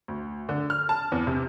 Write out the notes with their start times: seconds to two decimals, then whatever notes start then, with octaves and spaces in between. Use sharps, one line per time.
0.08 D2
0.49 D3
0.70 F6
0.89 A5
1.12 E2
1.27 C3